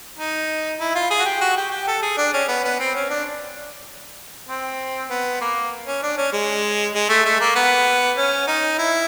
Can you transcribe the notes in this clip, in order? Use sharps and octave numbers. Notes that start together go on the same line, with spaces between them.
D#4
E4
F4
G#4
F#4
G4
F#4
G4
G4
A4
G#4
D4
C#4
B3
B3
C4
C#4
D4
C4
B3
A#3
C#4
D4
C#4
G#3
G#3
A3
A3
A#3
B3
C#4
D#4
E4